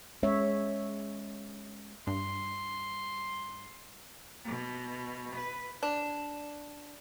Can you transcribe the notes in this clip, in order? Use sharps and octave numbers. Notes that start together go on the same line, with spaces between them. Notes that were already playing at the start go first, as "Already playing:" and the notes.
G#3 C#4 C#5 E5
G2 C6
B2
B4
D4